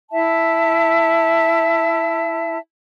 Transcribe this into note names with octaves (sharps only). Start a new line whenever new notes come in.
E4 E5 A5